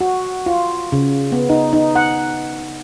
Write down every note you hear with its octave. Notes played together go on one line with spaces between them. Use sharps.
F#4
F4
C#3
B3
D#4
D#4
F#5